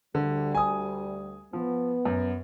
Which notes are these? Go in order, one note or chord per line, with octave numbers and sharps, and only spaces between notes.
D2 D3 G3
G#5 D#6
F3 B3
F#2